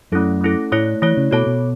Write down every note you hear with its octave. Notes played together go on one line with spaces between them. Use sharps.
F#2 A3 C#4 E4 A4
A3 C#4 E4 A4
A2 A3 E4 C#5
E3 A3 E4 C#5
C#3
B2 F#4 A4 C#5 A5
B2